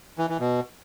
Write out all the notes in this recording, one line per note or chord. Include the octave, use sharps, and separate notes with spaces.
E3
E3
B2